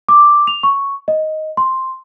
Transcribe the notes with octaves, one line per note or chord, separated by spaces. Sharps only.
D6
F7
C#6
D#5
C6